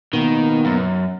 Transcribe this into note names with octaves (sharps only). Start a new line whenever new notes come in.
B2 D#3 A#3 B3
F#2